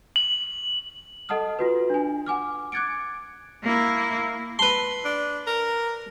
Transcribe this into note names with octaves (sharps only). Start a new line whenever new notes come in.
F#7
A4 D#5 F#5 A5 D#6 F6
F4 F#4 B4
D4 G#5
F#5 G#5 D6 F6
D6 F#6 G#6 A6 C#7 D7
A#3 E4
B4 A5 C6
D4
A#4